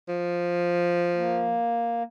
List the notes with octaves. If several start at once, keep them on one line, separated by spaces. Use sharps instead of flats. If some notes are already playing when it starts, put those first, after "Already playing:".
F3
A#3